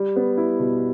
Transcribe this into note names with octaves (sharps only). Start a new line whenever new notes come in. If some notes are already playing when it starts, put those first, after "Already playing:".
Already playing: G3
B3
E4
B2